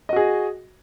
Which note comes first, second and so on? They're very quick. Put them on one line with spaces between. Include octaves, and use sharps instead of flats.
D#5 F#4 G#4